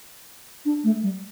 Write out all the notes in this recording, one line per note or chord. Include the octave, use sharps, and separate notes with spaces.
D4
A3
G3